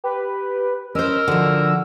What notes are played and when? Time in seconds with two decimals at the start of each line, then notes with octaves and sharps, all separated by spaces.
0.04 G4 B4
0.95 C#4 A#4 C5 D#5 E6
1.28 D3 F3 F#4